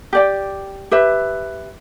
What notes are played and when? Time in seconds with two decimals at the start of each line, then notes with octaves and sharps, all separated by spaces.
0.13 G4 D5 G5
0.91 G4 B4 E5